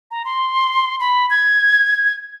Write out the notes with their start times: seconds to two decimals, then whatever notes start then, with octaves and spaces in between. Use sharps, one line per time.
0.11 A#5
0.25 C6
1.00 B5
1.30 G#6